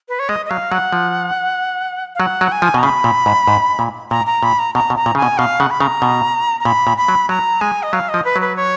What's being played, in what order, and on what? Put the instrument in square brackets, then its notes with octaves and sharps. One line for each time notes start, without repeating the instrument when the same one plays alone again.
[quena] B4
C#5
[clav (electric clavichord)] G#3 [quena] D#5
[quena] D#5
[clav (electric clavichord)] F#3 [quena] F5
[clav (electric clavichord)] F#3 [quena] F#5
[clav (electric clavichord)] F3
[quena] F5
[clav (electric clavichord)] F#3 [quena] F#5
[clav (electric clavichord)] F#3
[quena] G#5
[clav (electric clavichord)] F3
[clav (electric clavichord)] B2 [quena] A#5
[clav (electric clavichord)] C#3 [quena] B5
[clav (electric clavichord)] A#2
G#2
G#2
A#2
[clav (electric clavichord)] A#2 [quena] A#5
[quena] A#5
[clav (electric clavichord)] A#2 [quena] B5
[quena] A#5
[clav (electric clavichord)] B2 [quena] A#5
[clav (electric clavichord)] B2
[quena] A#5
[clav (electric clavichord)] A#2
[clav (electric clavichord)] C#3 [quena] G#5
[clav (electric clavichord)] B2
[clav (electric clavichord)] B2 [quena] F5
[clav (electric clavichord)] C#3 [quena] F#5
[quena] B5
[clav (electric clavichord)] C#3 [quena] A#5
[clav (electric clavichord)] B2
[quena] A#5
[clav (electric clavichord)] A#2 [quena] B5
[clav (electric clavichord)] A#2
[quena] B5
[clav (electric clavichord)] F#3
[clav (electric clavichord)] F#3 [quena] A#5
[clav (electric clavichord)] G#3 [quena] G#5
[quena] D#5
[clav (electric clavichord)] F#3 [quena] F5
[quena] D#5
[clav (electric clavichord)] F3
[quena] B4
[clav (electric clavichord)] F#3
[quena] B4
C#5